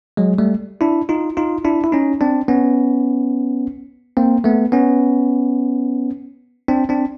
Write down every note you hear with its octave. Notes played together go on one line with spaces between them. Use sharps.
F#3 G#3
G3 A3
D4 E4
D#4 F4
D#4 F4
D4 E4
E4
C#4 D#4
C4 D4
B3 C#4
A#3 C4
A3 B3
B3 C#4
C4 D4
C4 D4